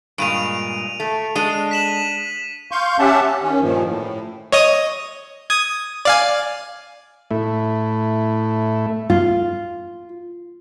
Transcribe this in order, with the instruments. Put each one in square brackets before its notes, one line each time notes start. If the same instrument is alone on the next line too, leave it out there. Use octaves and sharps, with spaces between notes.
[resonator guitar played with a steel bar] G2 A#2 G#3 [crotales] D7 D#7 F7
[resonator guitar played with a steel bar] A3
[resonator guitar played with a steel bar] G#3 D4 [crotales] D#7
[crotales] B6 E7 F#7
[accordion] F5 C6 C#6 G6
C#4 G4 E5 F#5 A5
C#4
D#3 C#4
G2 A#2 D#3 F3
A2
[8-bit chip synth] C#5 D#5 D#6
D#6 G#6
D5 F5 G#5
[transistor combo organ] A2 A3 E4
[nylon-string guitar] F4